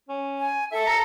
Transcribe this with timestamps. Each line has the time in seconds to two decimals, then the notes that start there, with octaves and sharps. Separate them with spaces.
0.09 C#4
0.39 G#5
0.72 A4 E5
0.87 A#5